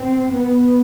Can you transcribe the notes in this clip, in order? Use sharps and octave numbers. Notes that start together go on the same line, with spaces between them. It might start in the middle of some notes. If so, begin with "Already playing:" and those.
Already playing: C4
B3